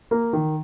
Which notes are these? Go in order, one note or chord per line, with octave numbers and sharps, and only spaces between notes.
A#3
D#3